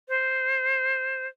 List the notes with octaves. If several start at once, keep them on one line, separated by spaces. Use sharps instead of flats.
C5